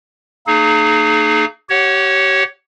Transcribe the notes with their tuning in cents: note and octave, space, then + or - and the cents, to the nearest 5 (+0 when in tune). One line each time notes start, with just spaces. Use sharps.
A#3 -30 D#4 -25 G#4 +35
G4 -30 C#5 +0 F#5 +0